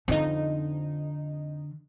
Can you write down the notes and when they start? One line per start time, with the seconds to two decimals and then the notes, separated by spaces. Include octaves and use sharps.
0.08 F2 D3 D#4